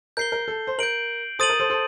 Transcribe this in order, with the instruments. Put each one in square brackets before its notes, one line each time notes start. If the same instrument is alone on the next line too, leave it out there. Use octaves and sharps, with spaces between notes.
[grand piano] A#4 [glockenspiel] G6 C7 G7
[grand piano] A#4
A4
C5
[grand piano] A#4 [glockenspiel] G6 D7 F#7
[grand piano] A4 C5 [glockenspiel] D#6 A6 D#7 F#7
[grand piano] A#4
A4 C5
A4 C5